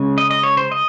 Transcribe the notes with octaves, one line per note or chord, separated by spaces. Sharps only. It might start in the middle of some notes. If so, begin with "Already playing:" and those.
Already playing: C#3 G#3 C#4
D#5
D#5
C#5
C5
D#5